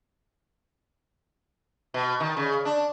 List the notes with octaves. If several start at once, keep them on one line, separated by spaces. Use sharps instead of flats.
B2
D#3
C#3
D4